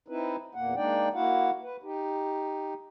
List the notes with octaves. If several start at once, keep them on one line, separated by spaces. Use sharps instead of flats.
C4 D#4 E4 B4
E2 A#2 A#3 F#5
G#3 A#3 D4 D#4 D5 G5
A#3 E4 F#4 F5 F#5
B4
D#4 G4